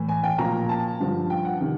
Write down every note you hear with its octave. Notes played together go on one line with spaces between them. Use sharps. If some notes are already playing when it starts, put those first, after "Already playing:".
Already playing: A2 E3
G#5
G5
A#2 F3 A#5
A5
G2 D3 F3
G5
F#5
C3 D#3